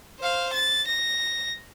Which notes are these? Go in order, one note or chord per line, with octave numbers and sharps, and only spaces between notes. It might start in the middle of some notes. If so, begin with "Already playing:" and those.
C5 F5
A6
A#6